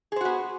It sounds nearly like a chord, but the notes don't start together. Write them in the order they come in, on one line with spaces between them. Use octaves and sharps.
G#4 C5 F#4 B3